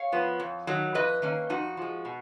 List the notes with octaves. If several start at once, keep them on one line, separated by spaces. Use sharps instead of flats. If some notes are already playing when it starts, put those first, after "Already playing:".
Already playing: C#5 F5
F3 B3
F2
D#3 F#3
F2 B4 D#5
D#3 A#3 C#4
F2 D#4 F#4
F3 G#3
B2